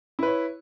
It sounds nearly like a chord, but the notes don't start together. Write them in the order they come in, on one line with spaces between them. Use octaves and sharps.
E4 B4 C#5